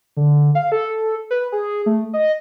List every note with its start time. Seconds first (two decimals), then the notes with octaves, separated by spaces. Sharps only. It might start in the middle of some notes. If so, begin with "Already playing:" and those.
0.17 D3
0.55 F5
0.72 A4
1.31 B4
1.52 G#4
1.86 A3
2.13 D#5